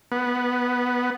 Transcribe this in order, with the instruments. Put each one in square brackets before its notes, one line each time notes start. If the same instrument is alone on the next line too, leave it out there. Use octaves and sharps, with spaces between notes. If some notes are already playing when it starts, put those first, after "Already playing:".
[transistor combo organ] B3